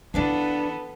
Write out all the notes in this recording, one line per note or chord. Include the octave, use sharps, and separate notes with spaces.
E3 B3 D4 E4 A4 B4 F5